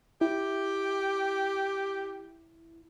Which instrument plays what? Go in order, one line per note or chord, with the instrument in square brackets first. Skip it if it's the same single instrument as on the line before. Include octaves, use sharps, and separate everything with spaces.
[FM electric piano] E4 [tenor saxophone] G4